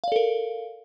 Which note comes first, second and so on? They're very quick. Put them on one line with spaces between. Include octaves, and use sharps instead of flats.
F5 D5 A4 A#4